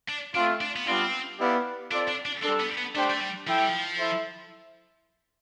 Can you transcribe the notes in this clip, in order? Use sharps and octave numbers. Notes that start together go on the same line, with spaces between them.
D4
A3 C4 D4 F4
D4
B3
G3 B3 C4 D4 F4
B3 E4 G4 D5 F5
C4 D4 F4 A4 D5
D4
D4
G3 C4 D4 A4
B3
B3
A3 D4 G4 C5 G5
A3
G3
F3 E4 A4 E5 G5
G3
F3
E4 A4 C5 E5